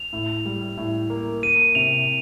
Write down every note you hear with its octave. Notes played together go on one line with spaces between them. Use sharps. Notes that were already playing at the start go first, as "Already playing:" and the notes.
Already playing: F7
A2
G3
A2
A#3
A#3 D#7
C3 F7